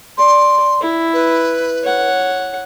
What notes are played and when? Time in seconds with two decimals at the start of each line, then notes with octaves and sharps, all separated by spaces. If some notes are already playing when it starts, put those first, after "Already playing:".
0.18 D5 C6
0.81 E4
1.13 B4
1.83 C#5 F#5